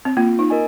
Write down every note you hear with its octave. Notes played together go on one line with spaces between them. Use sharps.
C4
A#3 F4
D#4
A#4 D#5 G#5